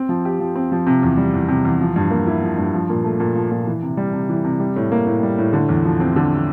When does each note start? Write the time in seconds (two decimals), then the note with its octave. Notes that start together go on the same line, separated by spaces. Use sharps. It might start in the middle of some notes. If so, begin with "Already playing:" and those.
Already playing: C4
0.09 F3
0.25 G4
0.40 F3
0.55 C4
0.72 F3
0.87 C3
1.03 E2
1.17 G3
1.34 E2
1.48 C3
1.65 E2
1.81 F3
1.96 G2
2.11 A#3
2.27 E4
2.42 F3
2.58 G2
2.74 F3
2.90 A#2
3.04 A3
3.20 A#2
3.35 F3
3.51 A#2
3.67 E3
3.82 C3
3.97 G3
4.13 C3
4.29 E3
4.44 C3
4.60 G3
4.76 A2
4.92 A#3
5.06 A2
5.23 G3
5.38 A2
5.53 D3
5.69 E2
5.85 F3
6.00 C4
6.16 D3